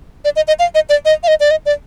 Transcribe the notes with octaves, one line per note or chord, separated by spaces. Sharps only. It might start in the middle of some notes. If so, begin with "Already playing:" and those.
D5
D#5
D#5
F5
D#5
D5
D#5
F5
D#5
D5
D#5
D5